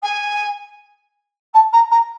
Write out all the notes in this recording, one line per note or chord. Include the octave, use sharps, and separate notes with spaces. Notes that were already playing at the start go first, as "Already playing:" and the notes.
G#5
A5
A#5
A#5